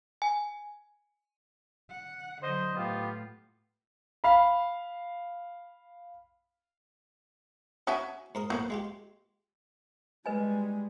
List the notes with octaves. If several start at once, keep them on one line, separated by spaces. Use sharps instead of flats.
G#5
F#5
D3 F#3 C5 D#5
A2 B3 F4 G4
F5 B5
C#4 E4 F#4 E5 G#5
G#2 A#4 D#6
A2 F#3 A#3 B3
G#3 F4 G4
G3 G#3 B4 D#5 G#5